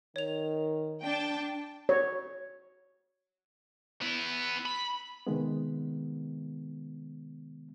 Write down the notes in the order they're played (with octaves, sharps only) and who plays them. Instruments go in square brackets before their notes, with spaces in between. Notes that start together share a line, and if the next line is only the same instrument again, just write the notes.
[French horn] D#3 [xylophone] C#5 F7
[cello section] D4 [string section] G5 A5
[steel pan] C#5
[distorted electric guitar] B3 E4
B5
[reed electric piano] C3 D#3 G#3 B3